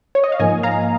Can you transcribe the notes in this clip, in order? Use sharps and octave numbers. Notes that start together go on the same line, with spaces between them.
C#5
D#5
F5
G#2 F3 A#3 D#5 G#5
F5 A#5